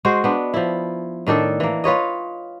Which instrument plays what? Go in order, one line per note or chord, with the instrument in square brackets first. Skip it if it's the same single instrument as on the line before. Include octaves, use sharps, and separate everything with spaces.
[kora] G#3 F#4 C5
B3 D4
F3 E4
A2 D#3 D4 A4
E3 A#3
F4 B4 C#5 D#5